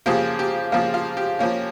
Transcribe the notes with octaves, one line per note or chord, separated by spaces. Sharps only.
C#3 F3 A#3 G4
G4
C#3 F3 A#3 F4
F4
G4
F3 A#3 C#4